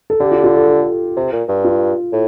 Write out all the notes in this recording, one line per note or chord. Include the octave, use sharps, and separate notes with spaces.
A4
D3 G4
F4
F4
A4
A4
C3
A#2
G2
F4
A2